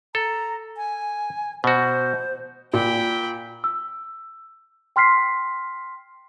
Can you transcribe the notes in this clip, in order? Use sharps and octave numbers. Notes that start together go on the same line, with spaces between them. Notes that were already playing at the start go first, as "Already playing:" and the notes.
A4 A#5
G#5
B2 F#4 C5
A#2 G5 B5
E6
G5 C6 F6 B6 C7